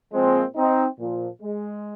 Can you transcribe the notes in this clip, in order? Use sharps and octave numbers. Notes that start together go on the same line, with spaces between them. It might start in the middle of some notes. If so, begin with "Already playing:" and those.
A#2 F3 G#3 C4
C4 D#4
A#2 F3
G#3